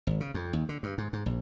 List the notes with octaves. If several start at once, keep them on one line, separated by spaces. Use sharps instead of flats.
G#1
C#3
F2
D#2
D3
G2
G#2
G#2
A#1